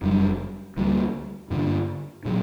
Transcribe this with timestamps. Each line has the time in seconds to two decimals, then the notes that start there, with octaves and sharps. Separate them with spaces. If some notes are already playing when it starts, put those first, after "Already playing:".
0.01 F#1 F#2 C#3 G3
0.77 D2 D3 G3 A#3
1.51 G2 D3 A#3 D4
2.25 A#2 F#3